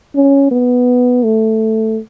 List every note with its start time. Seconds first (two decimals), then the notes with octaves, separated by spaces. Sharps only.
0.15 C#4
0.51 B3
1.24 A3